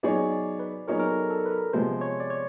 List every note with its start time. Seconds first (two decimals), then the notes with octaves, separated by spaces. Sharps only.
0.03 F#3 B3 D#4 G#4 C#5 D5
0.32 D5
0.60 B4
0.88 F#3 B3 D#4 G#4 A#4 C#5
0.99 A#4
1.09 A4
1.30 A4
1.46 B4
1.52 A#4
1.73 C3 F3 G#3 B3 C5
2.01 C#5
2.20 D5
2.30 C#5